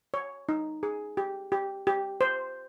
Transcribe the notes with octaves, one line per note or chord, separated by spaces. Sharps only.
C#5
D#4
G#4
G4
G4
G4
C5